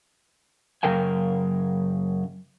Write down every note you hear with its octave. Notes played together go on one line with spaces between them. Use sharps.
F#2 C#3 A#4 G5 G#5